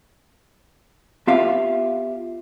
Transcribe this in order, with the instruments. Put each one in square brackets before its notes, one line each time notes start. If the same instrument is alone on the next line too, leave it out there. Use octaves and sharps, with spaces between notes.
[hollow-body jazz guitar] B3 F4 G4 E5 F5